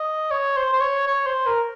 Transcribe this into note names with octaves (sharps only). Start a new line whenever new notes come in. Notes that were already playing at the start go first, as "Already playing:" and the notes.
Already playing: D#5
C#5
C5
C5
C#5
C#5
C5
A#4